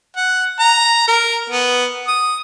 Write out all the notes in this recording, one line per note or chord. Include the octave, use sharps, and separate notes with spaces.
F#5
A#5
A#4
B3
D#6